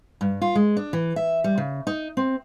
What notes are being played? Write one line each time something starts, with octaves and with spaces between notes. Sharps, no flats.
G2
F4
G#3
D4
E3
E5
G3
C#3
D#4
C4